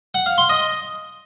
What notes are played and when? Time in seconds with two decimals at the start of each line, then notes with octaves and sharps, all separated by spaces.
0.14 F#5
0.26 F5
0.38 C6
0.49 D#5